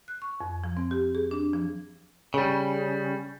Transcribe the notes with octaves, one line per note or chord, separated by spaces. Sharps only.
F#6
C#6
F2
F3
C4
G4
G#4
D4
F3
C#3 G3